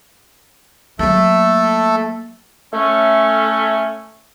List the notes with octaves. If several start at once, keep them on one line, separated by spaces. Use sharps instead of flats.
F#3 A3 A#3 A4
A3 C#4